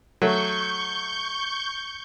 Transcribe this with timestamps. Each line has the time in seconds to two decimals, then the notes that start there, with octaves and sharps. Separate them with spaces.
0.22 F#3 A3 C#6 G6